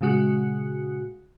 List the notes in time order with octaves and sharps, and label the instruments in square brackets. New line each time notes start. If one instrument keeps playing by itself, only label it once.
[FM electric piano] A#2 C#3 G#3 F#4 F#6